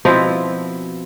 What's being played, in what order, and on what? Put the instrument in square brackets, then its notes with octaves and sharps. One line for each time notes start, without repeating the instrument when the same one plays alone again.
[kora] B2 F3 C4 E4